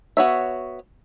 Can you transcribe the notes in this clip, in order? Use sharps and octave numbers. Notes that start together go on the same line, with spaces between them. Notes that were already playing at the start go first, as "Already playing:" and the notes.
B3 F#4 C#5 E5